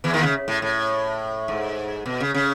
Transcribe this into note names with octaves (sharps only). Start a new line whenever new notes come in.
E2 E3
D#2 D#3
C#3
A2
A2
G#2
B2
C#3
C#3